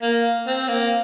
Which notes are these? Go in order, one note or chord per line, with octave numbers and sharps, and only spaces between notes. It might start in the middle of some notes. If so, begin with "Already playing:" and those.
A#3
C4
A#3